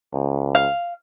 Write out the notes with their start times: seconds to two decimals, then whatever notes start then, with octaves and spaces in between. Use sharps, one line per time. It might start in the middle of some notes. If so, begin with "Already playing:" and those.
0.13 C#2
0.55 F5